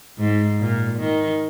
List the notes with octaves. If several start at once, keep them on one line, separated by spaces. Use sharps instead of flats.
G#2
A#2
D#3